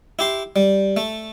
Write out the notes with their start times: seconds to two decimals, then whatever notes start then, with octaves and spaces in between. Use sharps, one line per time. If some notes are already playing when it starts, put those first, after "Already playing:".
0.19 E4 G4 C6
0.56 G3
0.97 A3